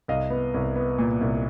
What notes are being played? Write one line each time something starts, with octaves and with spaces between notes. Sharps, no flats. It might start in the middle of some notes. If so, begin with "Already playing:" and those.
C2 D#5 F5
B3
C2
B3
A#2
C2